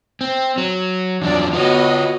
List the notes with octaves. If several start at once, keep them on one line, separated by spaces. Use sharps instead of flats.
C4
F#3
E2 F3 F#3 D4 D5
B3 F4 F#4 C#5 D#5